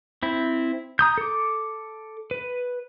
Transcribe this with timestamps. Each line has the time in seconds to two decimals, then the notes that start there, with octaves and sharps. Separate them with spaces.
0.23 C4 E4
0.99 A#5 D#6 G6
1.18 A4 D6
2.31 B4